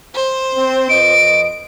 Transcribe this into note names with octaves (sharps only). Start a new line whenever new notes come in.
C5
C4
F2 B4 D#5 D7